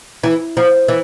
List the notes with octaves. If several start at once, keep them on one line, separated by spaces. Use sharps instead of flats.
E3
F3
E3